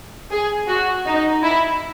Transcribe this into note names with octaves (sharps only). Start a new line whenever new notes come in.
G#4
F#4
D#4
E4